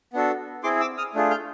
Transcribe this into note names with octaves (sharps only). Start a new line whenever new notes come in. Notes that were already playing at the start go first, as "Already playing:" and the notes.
B3 D4 F#4 A4
C4 E4 G#4 C6 D6
D6 E6
D#6 F6
A3 D4 F4 G#4
F6 G6